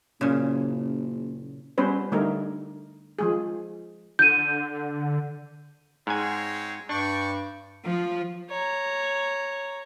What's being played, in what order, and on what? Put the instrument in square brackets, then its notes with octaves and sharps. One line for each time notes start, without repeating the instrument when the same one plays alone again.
[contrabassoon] F#1 [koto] A#2 C#3
[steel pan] G3 B3 C#4 B4 C5
D3 G3 A3 D#4 A#4
F3 G#3 G#4
[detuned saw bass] D3 [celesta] G6 D#7
[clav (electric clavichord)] G#2 G#5 [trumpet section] G#3 C4 C#5
[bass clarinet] G2 [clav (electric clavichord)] D4 [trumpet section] D5 G5 C#6
[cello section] F3
[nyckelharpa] C#5 A#5